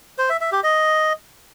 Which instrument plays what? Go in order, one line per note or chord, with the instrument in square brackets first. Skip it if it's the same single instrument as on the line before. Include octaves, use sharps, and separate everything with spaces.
[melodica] C5
E5
E5
G4
D#5